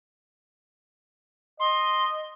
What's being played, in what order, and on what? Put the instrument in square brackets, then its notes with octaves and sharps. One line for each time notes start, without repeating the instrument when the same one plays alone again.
[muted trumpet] D#5 [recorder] C6